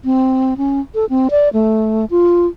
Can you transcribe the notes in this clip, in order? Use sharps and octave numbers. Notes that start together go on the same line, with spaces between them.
C4
C#4
A4
C4
D5
A3
F4